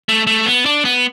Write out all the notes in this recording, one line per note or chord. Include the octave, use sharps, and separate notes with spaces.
A3
A3
B3
D4
B3